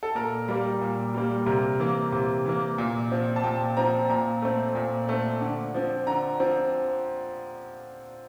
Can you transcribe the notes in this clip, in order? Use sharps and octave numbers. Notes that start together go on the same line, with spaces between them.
A4
A#2 A#4
G3 A#3
A#2
G3 A#3
C3 A#4
E3 A#3
C3
E3 A#3
A#2
F3 C4
A5
A#2 G5
F3 C4 A#5
A#2 A#5
A3 C4
A#2
A3 C4
D3
F3 C4
D3 A#5
F3 C4